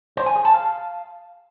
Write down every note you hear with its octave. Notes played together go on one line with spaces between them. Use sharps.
C5
G#5
G#4
A5
F5